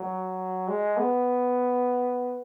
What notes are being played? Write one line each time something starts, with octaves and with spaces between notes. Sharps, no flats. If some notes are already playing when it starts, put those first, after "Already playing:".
Already playing: F#3
G#3
B3